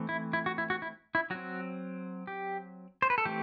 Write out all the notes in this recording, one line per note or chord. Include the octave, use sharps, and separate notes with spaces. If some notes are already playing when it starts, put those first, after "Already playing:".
Already playing: E3 A3 C4
E4
E4
F#4
E4
F#4
E4
E4
F#3 C4 F#4
G4
C5
B4
A4
E3 A3 C4 G4